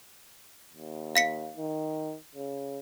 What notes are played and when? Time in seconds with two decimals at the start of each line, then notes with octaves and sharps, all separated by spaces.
0.74 D#2
1.16 F5 B6 C#7
1.57 D#3
2.35 C#3